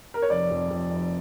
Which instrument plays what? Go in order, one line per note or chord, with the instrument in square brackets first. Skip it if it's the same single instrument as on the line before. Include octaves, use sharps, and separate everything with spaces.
[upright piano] A#4
C#5
F1 D5
F2
F2
F1